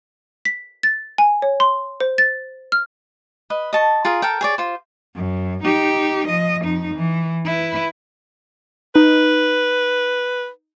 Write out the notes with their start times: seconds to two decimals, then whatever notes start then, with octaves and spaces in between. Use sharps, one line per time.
0.45 B6
0.83 A6
1.18 G#5
1.42 C#5
1.60 C6
2.00 C5
2.18 A6
2.72 F6
3.50 B4 D#5
3.73 D#5 A5 C#6
4.05 F4 G#4 A#4
4.22 A4 A#4 G5
4.41 G#4 C#5 D5
4.58 F4 C5
5.16 F#2
5.64 D#4 G4
6.28 F3 D#5
6.65 F2 D#4
6.95 E3
7.45 E4 B4
8.96 D#4 B4